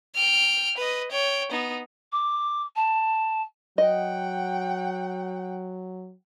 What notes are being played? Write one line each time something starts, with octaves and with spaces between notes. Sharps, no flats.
G5 F6
B4 D#5
C#5 G5
B3 D#4
D6
A5
F#3 D#5 F#5 G5